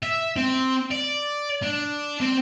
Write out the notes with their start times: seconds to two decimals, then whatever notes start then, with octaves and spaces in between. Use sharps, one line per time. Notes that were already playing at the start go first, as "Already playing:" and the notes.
0.03 E5
0.37 C4
0.91 D5
1.63 D4
2.21 C4